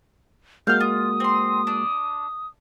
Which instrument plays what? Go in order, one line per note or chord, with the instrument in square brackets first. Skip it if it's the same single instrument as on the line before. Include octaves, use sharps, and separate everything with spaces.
[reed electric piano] G#3 A#3 F#4 [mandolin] F5 F6 [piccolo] G6
[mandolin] F4 [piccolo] D#6
[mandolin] C4 C6
D4